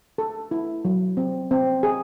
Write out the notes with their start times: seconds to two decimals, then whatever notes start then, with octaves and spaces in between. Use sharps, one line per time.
0.18 A4
0.51 E4
0.85 F#3
1.17 C4
1.51 C4
1.83 G#4